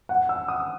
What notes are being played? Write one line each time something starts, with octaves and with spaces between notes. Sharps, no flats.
F#5
E6
D#6